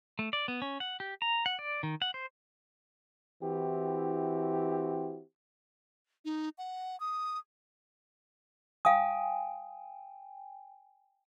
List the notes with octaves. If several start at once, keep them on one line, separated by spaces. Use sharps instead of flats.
A3
D5
B3
C#4
F#5
G4
A#5
F#5
D5
D#3
F#5
C5
E3 C4 E4 F#4 G4
D#4
F#5
D#6
F5 G5 G#5 D#6